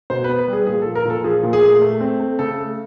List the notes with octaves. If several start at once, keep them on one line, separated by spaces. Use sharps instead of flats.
B2 C5
B4
B3
B4
G3 G#4
A#2 G#4
A4
F3
A#4
A#2 A4
F3 G#4
A#2
G#4
A3
A3
C4
A3
C#3 A4
A3